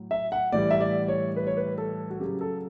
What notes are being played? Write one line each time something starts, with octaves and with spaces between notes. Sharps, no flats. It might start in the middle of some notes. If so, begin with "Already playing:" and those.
Already playing: A2 F#3
E5
F#5
A2 E3 G3 D5
E5
D5
C#5
B4
C#5
B4
A4
F#4
C#3 F#3 G4
A4